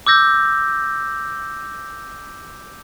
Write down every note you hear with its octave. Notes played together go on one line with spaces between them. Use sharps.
D6 E6 G6 A#6